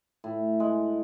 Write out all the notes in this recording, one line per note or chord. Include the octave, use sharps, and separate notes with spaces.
A2
G#3